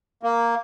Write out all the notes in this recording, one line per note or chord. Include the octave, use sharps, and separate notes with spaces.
A#3